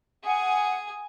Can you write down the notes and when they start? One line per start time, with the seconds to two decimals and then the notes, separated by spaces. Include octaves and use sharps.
0.24 G#4 F#5 G#5